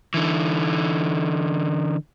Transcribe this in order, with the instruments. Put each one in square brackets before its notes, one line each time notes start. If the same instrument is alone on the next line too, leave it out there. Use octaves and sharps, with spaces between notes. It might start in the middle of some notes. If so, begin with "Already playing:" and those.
[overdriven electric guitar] D3 E3